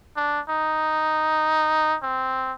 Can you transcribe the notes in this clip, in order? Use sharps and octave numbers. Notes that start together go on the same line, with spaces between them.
D4
D#4
C4